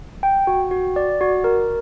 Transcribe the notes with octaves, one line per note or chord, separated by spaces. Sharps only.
G5
F#4
F#4
D5
F#4
A#4